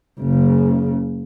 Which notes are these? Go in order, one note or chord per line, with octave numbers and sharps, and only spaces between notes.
F#1 C#3